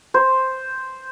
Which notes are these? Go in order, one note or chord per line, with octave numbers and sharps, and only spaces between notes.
C5